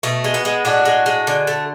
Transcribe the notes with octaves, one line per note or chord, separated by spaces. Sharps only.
B2 A3
G#3
B3
G#3
A2 D4 F#4
G#3
G#3
D3
A3